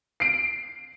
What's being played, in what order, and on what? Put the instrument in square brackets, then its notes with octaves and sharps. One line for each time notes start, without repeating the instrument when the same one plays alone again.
[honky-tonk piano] C7 D7